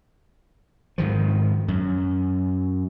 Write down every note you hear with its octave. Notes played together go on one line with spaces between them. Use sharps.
G#2 D#3 F3
F#2